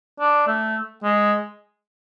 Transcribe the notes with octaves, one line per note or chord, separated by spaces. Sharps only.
D4
A3
G#3